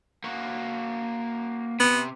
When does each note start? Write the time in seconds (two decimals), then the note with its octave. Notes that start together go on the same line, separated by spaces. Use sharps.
0.24 A#3 F#4
1.80 C3 B3